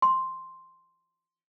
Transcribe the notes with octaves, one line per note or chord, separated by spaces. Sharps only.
C6